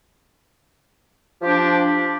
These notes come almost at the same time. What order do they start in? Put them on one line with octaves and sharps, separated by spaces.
F3 G4 D4